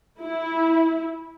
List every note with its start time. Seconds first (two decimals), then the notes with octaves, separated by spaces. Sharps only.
0.21 E4